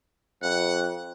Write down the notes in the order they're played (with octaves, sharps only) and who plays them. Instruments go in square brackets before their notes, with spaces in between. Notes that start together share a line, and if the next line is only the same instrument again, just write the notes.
[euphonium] F2 [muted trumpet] F#5